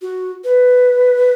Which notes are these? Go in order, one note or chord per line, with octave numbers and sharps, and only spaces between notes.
F#4
B4